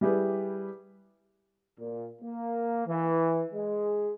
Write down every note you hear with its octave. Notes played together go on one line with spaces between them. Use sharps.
G3 E4 G4 G#4 B4
A#2
A#3
E3
G#3